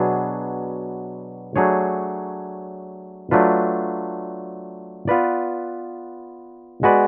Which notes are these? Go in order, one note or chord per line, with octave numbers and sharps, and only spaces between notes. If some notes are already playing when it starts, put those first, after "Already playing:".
Already playing: B2 F#3 B3 D4 G#4
F#3 A3 D4 G#4 C#5
F#3 A3 D4 F4 B4
B3 F4 B4 D5
G#3 B3 F#4 B4 D5